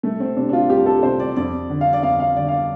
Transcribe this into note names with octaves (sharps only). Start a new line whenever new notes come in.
C2 A3
C4
C3 D4
D4
F4
C2 G4
A4
C3 C5
D5
F2 D5
D3
F5
D5
F2 F5
F5
D3 D5
F5
D5